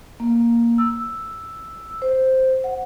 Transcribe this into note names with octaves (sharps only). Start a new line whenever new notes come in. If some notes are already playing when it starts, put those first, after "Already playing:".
A#3
E6
C5
F#5